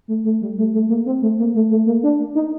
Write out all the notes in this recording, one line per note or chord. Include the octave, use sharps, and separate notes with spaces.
A3
A3
G3
A3
A3
A#3
C4
A3
A#3
A3
A3
A#3
D4
D#4